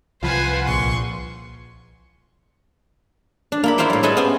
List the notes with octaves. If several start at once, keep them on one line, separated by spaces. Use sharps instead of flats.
C2 F3 F4 B4 C5 F#5 G#5
A#1 C6 C#6
D4
A#3 E4 B5
E4 F4 A#4 C5 G5
A2 G3
G#4 A4 B4 D#5 E5 G#5
B3 C#4 C5 G5 G#5